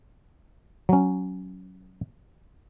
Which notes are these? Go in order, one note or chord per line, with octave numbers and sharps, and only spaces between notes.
F#3 C#4